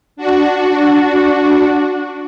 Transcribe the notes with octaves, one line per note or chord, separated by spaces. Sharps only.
D4 F#4